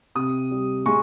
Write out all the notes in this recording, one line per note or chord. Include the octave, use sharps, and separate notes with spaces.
C3 D#6
G3
G#3 C#6